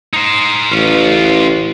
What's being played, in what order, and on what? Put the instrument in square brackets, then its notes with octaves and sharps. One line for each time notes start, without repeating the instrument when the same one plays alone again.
[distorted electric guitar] D#4 C5
[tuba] A1 [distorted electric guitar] C#4 F4